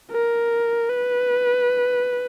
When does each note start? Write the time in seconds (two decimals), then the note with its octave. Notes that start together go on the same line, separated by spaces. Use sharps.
0.11 A#4
0.89 B4